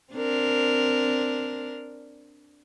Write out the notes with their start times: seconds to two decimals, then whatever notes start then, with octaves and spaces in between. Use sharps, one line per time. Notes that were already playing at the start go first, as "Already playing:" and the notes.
0.13 C4 D4 A#4